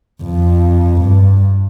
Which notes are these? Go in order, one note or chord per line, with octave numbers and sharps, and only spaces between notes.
F2
G2